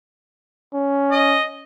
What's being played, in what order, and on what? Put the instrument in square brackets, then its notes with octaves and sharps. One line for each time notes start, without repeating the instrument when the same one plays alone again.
[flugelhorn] C#4
[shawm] D#5